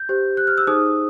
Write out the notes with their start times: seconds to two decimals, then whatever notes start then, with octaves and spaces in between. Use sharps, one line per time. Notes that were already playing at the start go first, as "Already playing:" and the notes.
Already playing: G6
0.09 G4 C5
0.37 F#6
0.47 F6
0.58 E6
0.67 D#4 G#4 C5 D#6